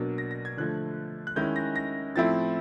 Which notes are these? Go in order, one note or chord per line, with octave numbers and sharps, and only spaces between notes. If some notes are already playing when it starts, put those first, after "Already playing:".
Already playing: B2 F#3 A#3 D4
A#6
A#6
G#6
D3 F3 A3 F#6
F#6
D#3 G#3 C#4 E4 G6
A#6
A#6
A2 F3 A3 C4 E4 A6